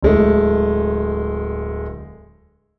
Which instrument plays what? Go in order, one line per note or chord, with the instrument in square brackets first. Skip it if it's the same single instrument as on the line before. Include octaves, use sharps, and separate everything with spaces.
[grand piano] D1 G#3 A3